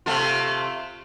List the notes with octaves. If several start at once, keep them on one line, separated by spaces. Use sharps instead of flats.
C3 A3 F4